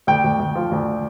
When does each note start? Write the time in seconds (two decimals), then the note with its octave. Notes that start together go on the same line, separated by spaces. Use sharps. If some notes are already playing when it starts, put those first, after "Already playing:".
0.07 D2 G5
0.24 D2
0.39 D2
0.55 F3
0.72 D2